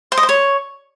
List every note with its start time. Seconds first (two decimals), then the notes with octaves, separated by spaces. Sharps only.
0.12 C5
0.17 D#5
0.23 C5
0.29 C#5